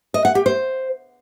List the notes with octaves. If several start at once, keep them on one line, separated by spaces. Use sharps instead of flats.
D#5
F#5
G4
C5